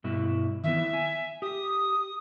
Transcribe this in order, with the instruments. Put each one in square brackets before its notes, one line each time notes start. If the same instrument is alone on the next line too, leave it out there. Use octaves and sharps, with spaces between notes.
[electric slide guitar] G2 B2 E4
[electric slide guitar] D#3 E3 B3 [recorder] E5
[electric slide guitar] G#5
[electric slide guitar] G4 [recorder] D#6